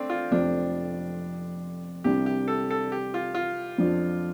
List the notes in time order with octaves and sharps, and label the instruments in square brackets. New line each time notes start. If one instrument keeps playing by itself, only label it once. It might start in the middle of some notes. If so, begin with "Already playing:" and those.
Already playing: [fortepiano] A3 C4 D4
F4
[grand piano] F1 F2 F3 C4 [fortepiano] D4
[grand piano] C2 C3 G3 D4 [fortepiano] G4
[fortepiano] G4
A4
A4
G4
F4
F4
[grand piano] F2 F3 D4